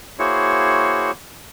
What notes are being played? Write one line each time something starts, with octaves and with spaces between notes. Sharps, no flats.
A#3 E4 F#4 G#4 C5 C#5